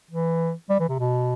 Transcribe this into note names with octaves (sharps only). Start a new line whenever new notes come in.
E3
G3
E3
C3
B2